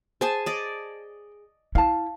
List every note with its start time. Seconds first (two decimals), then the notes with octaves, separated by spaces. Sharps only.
0.21 G#4 C5 G#5 A5
0.46 D5 D#5
1.75 E4 F5 A5